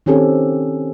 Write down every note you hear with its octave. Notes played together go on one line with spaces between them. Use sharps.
D#3 C4 C#4 G4 A4